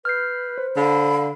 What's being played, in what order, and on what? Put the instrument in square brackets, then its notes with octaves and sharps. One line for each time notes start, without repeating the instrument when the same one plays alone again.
[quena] B4 [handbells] F6 G6 C7
[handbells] C5
[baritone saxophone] D3 [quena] F5 [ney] B5